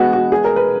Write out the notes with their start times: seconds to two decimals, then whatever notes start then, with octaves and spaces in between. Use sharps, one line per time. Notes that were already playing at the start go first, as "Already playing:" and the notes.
Already playing: B2 G#3 B3 F#4
0.13 F#4
0.32 G#4
0.44 A#4
0.56 B4